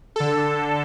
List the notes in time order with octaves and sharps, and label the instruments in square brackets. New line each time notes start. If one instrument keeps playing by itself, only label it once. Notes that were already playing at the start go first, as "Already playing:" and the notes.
[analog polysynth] D3 A4